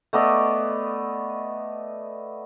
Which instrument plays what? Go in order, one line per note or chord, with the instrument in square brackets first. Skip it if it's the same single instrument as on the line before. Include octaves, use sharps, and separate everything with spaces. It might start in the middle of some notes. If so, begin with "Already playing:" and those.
[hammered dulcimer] A3 B3 D5 D#5